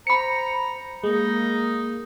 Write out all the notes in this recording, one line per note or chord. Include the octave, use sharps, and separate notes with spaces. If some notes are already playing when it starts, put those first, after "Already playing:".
C5 A#5 B5 C#7
G#3 A#3 D#4